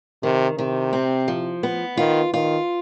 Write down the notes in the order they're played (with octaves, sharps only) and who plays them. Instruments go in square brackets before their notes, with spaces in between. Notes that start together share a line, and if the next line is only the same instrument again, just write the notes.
[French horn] C3 [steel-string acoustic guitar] D#3
[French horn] C3 [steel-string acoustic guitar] D#3
[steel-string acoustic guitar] C4
F3
B3
[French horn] D#3 [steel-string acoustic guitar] F4
[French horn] D#3 [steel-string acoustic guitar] F4